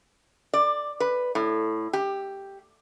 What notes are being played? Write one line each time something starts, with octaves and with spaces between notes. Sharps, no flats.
D5
B4
A2
G4